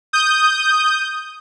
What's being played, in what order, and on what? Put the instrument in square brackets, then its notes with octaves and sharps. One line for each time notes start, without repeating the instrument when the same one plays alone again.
[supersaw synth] D#6 G6